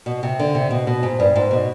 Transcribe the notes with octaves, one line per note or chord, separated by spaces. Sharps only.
B2
C3
D3
C3
B2
B2
G#2
G2
G#2
B2